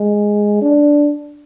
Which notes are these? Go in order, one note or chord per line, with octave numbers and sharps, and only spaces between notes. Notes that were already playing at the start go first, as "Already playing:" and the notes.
Already playing: G#3
D4